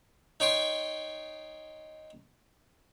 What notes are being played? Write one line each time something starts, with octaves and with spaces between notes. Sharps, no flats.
D#4 C#5 G5 C6 C#6